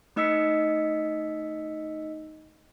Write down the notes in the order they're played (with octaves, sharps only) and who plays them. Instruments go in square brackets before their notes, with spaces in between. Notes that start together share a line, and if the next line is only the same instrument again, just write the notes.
[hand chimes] A3 D#4 D#5 E6 B6 C#7